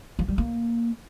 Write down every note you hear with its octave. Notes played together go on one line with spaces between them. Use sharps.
F3
G3
A#3